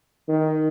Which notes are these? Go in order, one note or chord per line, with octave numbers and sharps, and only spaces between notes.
D#3